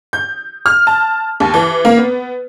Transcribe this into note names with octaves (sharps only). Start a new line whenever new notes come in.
G6
F6
A5
D#2
E3
A#3
B3